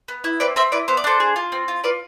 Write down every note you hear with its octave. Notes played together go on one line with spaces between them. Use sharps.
B3
E4
C4 B4 D5
C4 C5 E5
E4 B4 D5
B3 C5
D5
D4 A4 C5
G#4
F4
C4
F4
F4 B4 D5